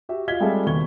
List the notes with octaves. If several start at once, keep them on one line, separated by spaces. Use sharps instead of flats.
F#4 G4 E5
F4 D#5 F5 G#6 B6 G7
G3 G#3 C4 G#4 A4 E5
D#2 B2 C#6 G#6 G7